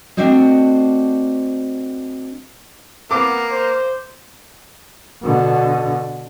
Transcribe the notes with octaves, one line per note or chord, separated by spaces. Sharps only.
A3 C4 D4 F#4 C5 D#5
A#3 B3 D6
C5
B2 D3